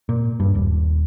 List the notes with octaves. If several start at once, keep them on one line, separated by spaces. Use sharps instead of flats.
A#2
G2
D#1